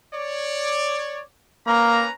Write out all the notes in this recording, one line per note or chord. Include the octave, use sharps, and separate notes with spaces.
C#5 D5
A#3 C#4 B4 A#5